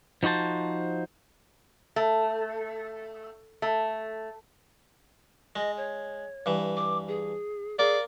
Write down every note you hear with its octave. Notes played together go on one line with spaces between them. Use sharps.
F3 D#4 F#4 C5 A5
A3
A3
G#3 D#5
C#5
G2 E3
D6
G#4
A#3 G#4 D5